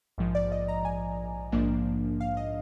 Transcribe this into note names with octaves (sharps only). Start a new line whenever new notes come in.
A#1 G#2 F3
D5
D#5
A#5
G#5
A#1 G#2 F3 A#3 D4
F5
D#5